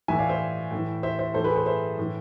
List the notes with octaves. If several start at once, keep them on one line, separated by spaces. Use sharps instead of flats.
A2 E3 E5 G#5
D5 F5
C5 E5
A2 E3
C5 E5
C5 E5
A2 E3 A4 C5
G#4 B4
A4 C5
C5 E5
A2 E3